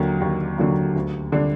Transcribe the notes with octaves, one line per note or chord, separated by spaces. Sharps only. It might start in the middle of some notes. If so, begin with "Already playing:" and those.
Already playing: D#2 D3 F#3 A#3
D#2
D3 F#3 A#3
D2
D3 G3 D4